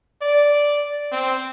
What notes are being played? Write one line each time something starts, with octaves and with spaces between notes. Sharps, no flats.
D5
C4